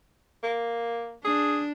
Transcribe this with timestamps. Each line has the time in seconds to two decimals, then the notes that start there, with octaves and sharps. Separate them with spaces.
0.43 A#3
1.25 D4 G#4